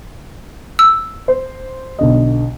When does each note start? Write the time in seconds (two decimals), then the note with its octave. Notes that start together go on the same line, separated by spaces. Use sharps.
0.79 E6
1.28 C5
1.99 B1 D3 D#5